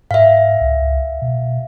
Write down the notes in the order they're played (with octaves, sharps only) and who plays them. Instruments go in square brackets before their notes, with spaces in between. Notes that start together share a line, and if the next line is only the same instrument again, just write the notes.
[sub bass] G#2 [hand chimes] E5 F5
[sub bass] C#2
B2